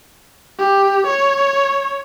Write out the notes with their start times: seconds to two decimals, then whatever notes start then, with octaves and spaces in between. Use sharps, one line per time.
0.59 G4
1.07 C#5